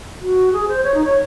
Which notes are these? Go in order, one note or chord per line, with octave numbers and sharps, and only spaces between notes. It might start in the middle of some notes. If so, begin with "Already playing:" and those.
F#4
G#4
C5
C#5
D#4
C#5